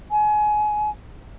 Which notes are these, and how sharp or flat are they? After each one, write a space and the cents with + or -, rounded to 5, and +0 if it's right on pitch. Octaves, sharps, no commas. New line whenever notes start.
G#5 +25